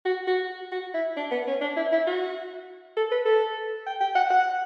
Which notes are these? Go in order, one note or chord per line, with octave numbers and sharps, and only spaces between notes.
F#4
F#4
F#4
E4
D4
B3
C#4
D4
E4
E4
F#4
A4
B4
A4
G5
G5
F#5
F#5